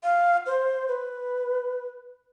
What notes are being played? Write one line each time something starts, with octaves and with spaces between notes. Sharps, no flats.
F5
C5
B4